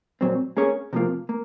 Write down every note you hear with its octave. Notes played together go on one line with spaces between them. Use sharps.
A#2 F#3 C4
A#3 C#4 G#4 C#5
C3 F3 A#3 F4
A#3